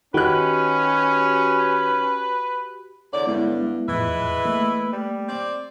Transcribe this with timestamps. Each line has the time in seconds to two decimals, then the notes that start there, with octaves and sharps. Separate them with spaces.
0.14 D#3 C#4 F#4 G4 B4 F#6
3.13 E2 D3 C#5 D5
3.27 G2 G#3 B3 E4
3.88 E2 A2 E3 F3 G#3 B4 E5
4.45 A3 A#3
4.93 G3
5.28 C4 D5